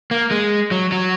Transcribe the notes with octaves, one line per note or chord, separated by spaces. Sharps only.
A#3
G#3
F#3
F#3